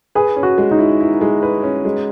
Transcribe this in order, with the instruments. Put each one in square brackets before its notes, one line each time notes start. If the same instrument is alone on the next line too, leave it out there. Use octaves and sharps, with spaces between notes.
[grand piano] G#4 [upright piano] B4
[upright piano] C#4
[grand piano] F#4
[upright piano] G#3
[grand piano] D#4
[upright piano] E4
E4
G#3
B4
C#4
G#3